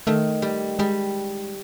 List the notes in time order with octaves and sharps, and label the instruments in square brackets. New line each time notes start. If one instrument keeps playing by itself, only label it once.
[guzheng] D#3 [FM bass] A3
[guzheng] G3
[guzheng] G3 [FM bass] G#3